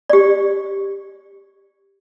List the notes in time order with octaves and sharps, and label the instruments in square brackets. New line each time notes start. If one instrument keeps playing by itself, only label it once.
[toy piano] G4 D5